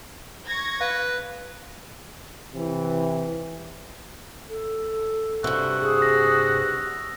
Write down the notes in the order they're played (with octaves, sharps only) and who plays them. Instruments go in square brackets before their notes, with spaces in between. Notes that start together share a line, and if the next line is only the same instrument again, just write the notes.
[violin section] C#6 G#6 A#6
[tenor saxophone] B4 [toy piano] F5
[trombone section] C3 E3
[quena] A4
[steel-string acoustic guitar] G2 C3 [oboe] F#4 [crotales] E6
[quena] G#4
[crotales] D#6 A#6